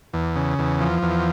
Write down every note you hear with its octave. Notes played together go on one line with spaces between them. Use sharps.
E2
C#3
E2
F3
E2